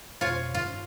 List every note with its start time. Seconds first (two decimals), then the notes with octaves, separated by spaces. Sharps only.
0.21 F2 B2 D#3 F4 C#5
0.54 G2 D#3 F4